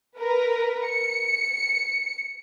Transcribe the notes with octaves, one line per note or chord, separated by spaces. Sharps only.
A#4 B4
C#7